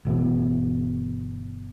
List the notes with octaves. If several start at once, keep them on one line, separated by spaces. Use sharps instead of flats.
G1 B2 E3 B3